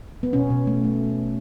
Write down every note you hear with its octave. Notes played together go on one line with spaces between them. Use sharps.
B3
B2 C#4
B2
A3
A3